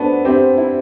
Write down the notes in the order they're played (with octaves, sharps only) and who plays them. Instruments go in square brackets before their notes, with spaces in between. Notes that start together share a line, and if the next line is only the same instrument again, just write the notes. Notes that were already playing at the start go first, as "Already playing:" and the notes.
Already playing: [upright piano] A3 B3 [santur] D4 F#4 C5
[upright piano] C4 [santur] G4 C5 E5
[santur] E4